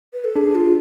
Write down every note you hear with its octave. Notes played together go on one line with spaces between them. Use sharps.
B4
A4
D4 G#4
F4